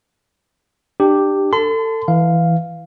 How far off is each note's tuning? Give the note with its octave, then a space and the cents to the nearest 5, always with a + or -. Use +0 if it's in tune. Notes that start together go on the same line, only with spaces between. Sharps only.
D4 +25 G4 +0
A4 +30 A5 +0 C6 -40
E3 +0 F5 +0